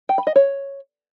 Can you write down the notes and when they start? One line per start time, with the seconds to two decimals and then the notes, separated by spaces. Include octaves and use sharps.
0.09 G5
0.18 B5
0.27 D#5
0.36 C#5